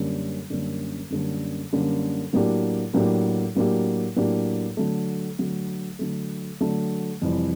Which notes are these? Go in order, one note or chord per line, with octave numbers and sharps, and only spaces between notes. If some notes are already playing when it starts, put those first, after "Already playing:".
Already playing: F#2 D3 G3 A#3 C#4
F#2 D3 G3 A#3 C#4
F#2 D3 G3 A#3 C#4
F#2 D3 G3 A#3 C#4
A2 F#3 A#3 D4 G4
A2 F#3 A#3 D4 G4
A2 F#3 A#3 D4 G4
A2 F#3 A#3 D4 G4
D3 F#3 A3
D3 F#3 A3
D3 F#3 A3
D3 F#3 A3
F2 C3 E3 G3